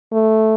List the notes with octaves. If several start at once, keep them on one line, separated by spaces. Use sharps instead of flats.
A3